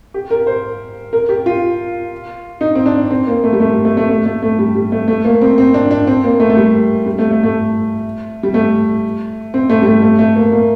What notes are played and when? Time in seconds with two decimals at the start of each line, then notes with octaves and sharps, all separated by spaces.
0.14 G4
0.30 A#4
0.47 C5
1.13 A#4
1.29 G4
1.46 F4
2.61 D#4
2.75 C4
2.86 D4
3.11 C4
3.27 A#3
3.44 A3
3.53 G3
3.60 A3
3.72 G3
3.85 A3
3.97 A3
4.09 A3
4.26 A3
4.43 A3
4.59 G3
4.75 G3
4.92 A3
5.08 A3
5.25 A#3
5.41 C4
5.58 C4
5.74 D4
5.91 D4
6.07 C4
6.24 A#3
6.40 A3
6.50 A3
6.57 G3
7.06 G3
7.18 A3
7.31 A3
7.43 A3
8.43 G3
8.54 A3
9.54 C4
9.69 A3
9.82 G3
9.86 A3
10.02 A3
10.19 A3
10.36 A#3
10.52 A#3